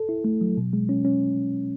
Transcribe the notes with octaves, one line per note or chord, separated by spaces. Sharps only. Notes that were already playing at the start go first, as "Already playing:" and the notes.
Already playing: A4
E4
A3
F#3
B2
G#3
C#4
C#4